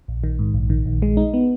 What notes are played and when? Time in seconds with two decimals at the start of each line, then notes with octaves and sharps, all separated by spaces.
0.08 A#1
0.24 D#3
0.39 G#2
0.54 A#1
0.70 D#3
0.85 A#1
1.02 G#3
1.17 D#4
1.34 B3